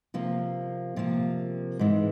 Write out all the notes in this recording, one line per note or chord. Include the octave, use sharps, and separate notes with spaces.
C3 F3 A#3
C3 F3 A#3
G#2 E3 G#3